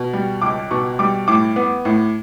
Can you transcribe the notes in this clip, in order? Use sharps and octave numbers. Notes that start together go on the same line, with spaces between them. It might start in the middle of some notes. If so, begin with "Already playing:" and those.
Already playing: B2
G3
C#2 D6
B2 C#6
G3 D6
A2 D6
B3
A2